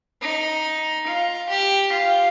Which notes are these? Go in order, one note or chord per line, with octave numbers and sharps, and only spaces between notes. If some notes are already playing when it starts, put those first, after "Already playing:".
D#4
F4
G4
F4